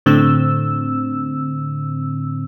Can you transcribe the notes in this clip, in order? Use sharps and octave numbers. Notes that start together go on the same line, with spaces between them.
A2 D3 C4 E6